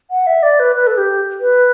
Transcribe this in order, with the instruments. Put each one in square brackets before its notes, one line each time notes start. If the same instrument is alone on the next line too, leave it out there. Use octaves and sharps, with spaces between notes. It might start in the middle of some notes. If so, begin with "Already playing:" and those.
[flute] F#5
E5
D5
B4
B4
A4
G4
B4